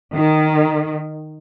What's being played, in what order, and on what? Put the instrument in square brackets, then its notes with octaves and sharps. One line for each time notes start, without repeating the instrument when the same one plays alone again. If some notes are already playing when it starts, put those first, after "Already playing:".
[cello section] D#3